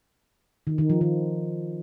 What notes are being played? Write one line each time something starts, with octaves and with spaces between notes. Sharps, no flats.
D#3
D#3
F3
D#3